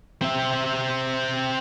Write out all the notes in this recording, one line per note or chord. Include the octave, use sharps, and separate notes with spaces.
C4 E5